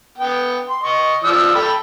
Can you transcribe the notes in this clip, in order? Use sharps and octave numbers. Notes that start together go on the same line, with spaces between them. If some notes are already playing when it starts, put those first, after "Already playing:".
B3 G5
C6
D#5 C#6
F3 D5 E6
A4 G5 B5